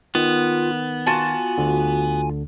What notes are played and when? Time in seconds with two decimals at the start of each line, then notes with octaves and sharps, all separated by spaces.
0.15 D#3 B3 F4
1.06 F4 F#4 G#5 A5
1.58 D2 D3